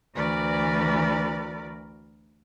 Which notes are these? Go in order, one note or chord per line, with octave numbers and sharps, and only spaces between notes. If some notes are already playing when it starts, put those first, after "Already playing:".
D2 E3 F#4 A#4 B4 D5